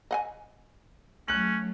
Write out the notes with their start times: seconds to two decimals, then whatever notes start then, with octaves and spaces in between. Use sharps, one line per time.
0.11 D#5 F#5 G#5
1.28 F#3 A3 C#4 F#6 F#7